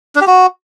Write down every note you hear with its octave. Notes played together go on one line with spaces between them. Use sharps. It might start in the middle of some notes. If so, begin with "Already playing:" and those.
D4
G4
F#4